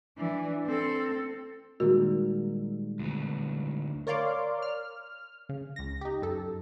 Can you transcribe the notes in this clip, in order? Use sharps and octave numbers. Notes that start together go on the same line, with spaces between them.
E3 D4
C4 A4
A#2 D#3 G3 G#3 A#3 F#4 A#4
D2 E3
A#4 C#5 D5 F5 C6 D6
F6
C#3
C#2 A#6
D#4 G4
F#2 A4